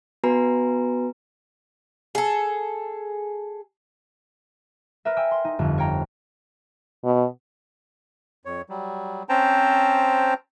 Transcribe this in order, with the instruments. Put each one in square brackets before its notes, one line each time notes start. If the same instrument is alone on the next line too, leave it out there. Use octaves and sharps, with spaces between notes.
[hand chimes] B3 F#4 B4 G#5 A#5
[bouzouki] G#4 A4
[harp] A#4 B4 E5
G5 G#5 E6
C6
D#4
G1 F2
C#5 F5 G5 A#5
[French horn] B2
[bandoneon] F2 C#5
F#3 G3
C4 C#4 C5 G5 A5 A#5